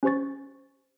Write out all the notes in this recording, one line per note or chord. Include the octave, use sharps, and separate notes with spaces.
C#4 G4 C5 C#6 A6